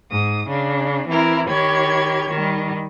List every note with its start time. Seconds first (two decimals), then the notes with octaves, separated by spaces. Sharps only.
0.11 G#2 D#6
0.48 C#3 D4
1.07 E3 C4 E4 A#4
1.48 D#3 G4 C#5 B5 G#6
2.30 D#3 G3